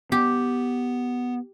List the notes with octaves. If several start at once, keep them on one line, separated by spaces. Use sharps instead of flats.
B3 G4